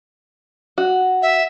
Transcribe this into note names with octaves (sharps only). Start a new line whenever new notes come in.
F#4
E5